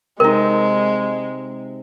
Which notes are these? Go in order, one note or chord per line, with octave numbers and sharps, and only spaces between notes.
C3 G#3 D#4 A#4